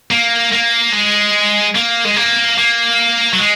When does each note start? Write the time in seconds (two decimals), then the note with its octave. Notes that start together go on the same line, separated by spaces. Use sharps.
0.11 A#3
0.52 A#3
0.92 G#3
1.75 A#3
2.05 G#3
2.16 A#3
2.58 A#3
3.33 F#3
3.39 G#3